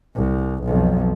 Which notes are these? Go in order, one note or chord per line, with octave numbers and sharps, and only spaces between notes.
C2
B1 F2